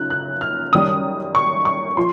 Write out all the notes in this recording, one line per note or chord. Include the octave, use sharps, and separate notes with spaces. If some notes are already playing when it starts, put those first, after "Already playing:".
Already playing: F#2 C#3 F3 D#4 F#6
F#6
F6
F#2 D#3 G3 D#6
C#6
C#6
F3 C6